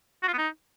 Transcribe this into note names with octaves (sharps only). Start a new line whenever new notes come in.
F#4
F4
B3
D#4